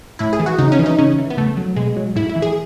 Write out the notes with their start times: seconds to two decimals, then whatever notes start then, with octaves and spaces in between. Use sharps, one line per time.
0.19 A2 E4
0.33 G#4
0.40 E3
0.46 F#4
0.58 C#3 D#4
0.72 C#4
0.79 E3
0.86 D#4
0.98 C#3 C#4
1.19 E3
1.30 B3
1.37 C#3 A3
1.57 F#3
1.76 B2 G#3
1.96 F#3
2.16 A2 E4
2.29 E4
2.36 E3
2.42 G#4